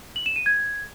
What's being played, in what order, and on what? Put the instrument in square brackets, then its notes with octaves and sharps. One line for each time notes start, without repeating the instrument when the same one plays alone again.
[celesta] F#7
E7
D#7
G#6